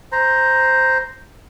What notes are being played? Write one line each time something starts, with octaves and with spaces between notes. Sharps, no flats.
C5 A#5